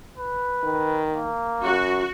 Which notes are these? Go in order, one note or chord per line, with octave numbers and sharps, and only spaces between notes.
B4
D#3
A#3
F#2 F#4